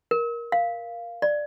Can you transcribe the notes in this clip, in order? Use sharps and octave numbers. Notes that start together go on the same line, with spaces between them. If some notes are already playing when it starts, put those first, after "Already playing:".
A#4
F5
D5